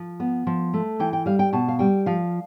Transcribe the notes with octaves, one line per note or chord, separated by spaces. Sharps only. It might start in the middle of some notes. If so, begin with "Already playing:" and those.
Already playing: F3
B3
F3
A3
E3 G5
G5
G3 F5
G5
B2 A5
F5
G3 G5
F3 F5